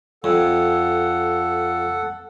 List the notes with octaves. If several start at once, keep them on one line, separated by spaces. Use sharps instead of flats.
F2 A4 F#5